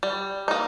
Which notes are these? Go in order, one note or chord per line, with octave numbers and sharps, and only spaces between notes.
G3
A#3 D#4